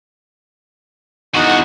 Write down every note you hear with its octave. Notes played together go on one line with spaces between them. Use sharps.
E2 D#4 F#4 F#5